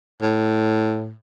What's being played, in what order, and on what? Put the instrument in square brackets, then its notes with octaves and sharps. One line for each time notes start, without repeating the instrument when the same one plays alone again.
[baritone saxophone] A2